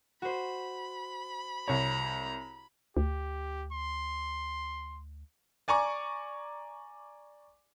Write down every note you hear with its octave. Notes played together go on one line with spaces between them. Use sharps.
F#4 C5 B5
C2 C#5 A#5
D2 G4
C6
D5 G#5 A#5 C#6 D6